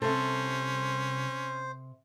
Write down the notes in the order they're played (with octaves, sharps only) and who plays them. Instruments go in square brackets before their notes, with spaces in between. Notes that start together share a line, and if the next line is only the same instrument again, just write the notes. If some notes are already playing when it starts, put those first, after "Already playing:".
[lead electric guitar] C2 [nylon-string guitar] C3 A4 [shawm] C#4 [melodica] C5